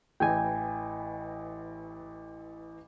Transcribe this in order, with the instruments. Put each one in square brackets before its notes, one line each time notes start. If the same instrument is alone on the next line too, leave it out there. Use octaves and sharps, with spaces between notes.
[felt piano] A1 E3 [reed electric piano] G5 G#5